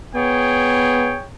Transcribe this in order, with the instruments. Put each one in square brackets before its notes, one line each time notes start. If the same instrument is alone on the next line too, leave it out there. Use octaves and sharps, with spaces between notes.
[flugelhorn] B3 [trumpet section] G#4 C#5 G5